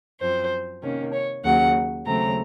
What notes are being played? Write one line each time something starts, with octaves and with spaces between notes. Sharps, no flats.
F#2 F3 C4 C5
C3 D#3 A#3 C#4
C#5
D#2 C#3 F#3 F#5
D#2 C#3 F#3 A3 C4 A#5